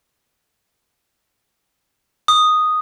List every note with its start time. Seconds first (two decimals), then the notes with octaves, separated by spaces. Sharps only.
2.28 D#6